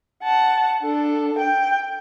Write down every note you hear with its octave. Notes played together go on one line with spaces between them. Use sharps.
F#5 A5
D4 A4
G5